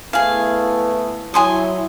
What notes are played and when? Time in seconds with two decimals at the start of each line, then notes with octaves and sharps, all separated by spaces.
0.13 A3 B3 E4 G#4 F5
1.34 F#3 E4 G#5 C6 D#6